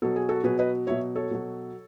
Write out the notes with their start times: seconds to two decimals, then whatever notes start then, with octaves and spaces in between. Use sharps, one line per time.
0.02 B2 F#3 A4
0.16 G#4
0.29 F#4 A4
0.44 B2 F#3 G#4 B4
0.59 B4 D#5
0.87 B2 F#3 C#5 E5
1.16 A4 C#5
1.31 B2 F#3